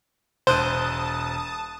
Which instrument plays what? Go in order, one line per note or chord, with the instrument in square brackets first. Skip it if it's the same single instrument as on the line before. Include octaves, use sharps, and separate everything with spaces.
[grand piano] E1 F#6 D#7 [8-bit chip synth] C5 [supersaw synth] A5 D#6